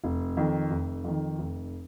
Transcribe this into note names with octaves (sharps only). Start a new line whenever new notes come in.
F1
F2 D#3
F1
F2 D#3
F1